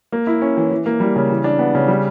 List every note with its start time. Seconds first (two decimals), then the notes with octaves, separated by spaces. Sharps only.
0.12 A#3
0.27 E4
0.42 C#4
0.57 E3
0.71 E3
0.86 A#3
1.00 G3
1.16 C#3
1.30 E3
1.44 D4
1.59 B3
1.75 C#3
1.88 G3